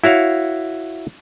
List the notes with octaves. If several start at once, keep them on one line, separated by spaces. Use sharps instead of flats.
E4 F#4 C#5 F5